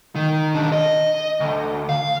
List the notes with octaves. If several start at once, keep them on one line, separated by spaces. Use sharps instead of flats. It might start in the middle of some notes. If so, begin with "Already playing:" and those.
D#3
B1 D4
D#5
D2
F5